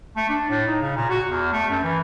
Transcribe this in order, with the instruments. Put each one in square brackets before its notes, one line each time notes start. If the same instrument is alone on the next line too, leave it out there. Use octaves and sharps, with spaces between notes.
[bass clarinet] A3
D4
A2
D#4
C#3
A#2
F#4
E2
A3
F#2
E3